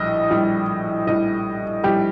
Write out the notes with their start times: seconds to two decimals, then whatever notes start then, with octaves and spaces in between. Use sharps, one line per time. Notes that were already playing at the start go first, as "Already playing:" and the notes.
Already playing: A#1 A2 G3 D#5
0.30 A#1 A2 G3
1.07 A#1 A2 G3 D#5
1.84 A#1 A2 G3 G4